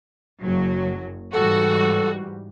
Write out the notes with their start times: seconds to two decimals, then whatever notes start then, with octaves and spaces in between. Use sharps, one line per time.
0.43 F#1 F#3
1.33 G#2 E3 G3 F#4 A4